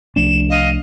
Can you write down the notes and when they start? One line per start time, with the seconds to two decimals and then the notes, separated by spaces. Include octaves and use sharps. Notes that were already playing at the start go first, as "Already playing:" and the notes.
0.16 C2 F3 A3 D4 E7
0.50 D#5 F5